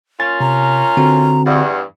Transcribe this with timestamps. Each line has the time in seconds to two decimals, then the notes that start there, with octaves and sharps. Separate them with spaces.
0.20 A#3 C#4 F4 A6
0.40 C3 A#5
0.97 D3 C4 F#4
1.46 E2 G2 F#5